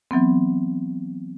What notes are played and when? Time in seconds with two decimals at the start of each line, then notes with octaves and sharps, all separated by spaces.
0.11 E3 F#3 B3 C4